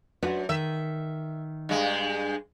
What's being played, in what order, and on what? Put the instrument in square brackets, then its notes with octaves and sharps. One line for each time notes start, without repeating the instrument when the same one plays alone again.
[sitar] F#2 A#2 [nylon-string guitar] D4 F#4 B4
[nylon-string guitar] D#3 [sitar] E5
[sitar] G2 G#3